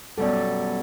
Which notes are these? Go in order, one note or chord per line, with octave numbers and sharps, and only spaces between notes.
F#2 B2 G3 A4 D5